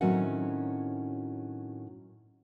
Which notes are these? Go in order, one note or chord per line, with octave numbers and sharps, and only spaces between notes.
A2 D#3 F#3 C4 C#4 F#5